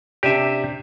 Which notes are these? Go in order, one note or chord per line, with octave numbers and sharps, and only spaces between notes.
C3 D4 G4 E5 D#7